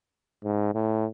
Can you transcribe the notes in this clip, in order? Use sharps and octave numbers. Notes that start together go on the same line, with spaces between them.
G#2
A2